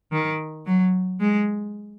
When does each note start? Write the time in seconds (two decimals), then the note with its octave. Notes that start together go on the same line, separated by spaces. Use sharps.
0.12 D#3
0.66 F#3
1.20 G#3